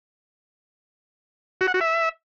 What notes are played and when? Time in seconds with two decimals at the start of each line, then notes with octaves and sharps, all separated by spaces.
1.61 F#4
1.67 F#5
1.74 F#4
1.81 E5